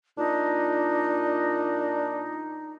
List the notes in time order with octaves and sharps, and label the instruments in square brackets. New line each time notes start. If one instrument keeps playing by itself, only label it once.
[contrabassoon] A#2 [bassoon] D4 [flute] D#4